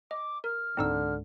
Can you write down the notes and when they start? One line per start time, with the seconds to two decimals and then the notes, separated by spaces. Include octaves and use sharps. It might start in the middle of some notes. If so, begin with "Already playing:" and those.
0.11 D#5 D6
0.44 A#4 F6
0.77 C#2 G#2 D3 C4 D4 D#4 E6